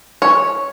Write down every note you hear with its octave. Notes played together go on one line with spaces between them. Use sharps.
C#5